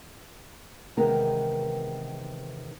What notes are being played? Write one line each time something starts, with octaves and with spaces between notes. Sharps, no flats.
E2 C3 D#3 G#3 B3 A#4